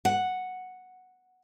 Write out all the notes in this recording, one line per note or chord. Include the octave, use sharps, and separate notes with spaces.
F#5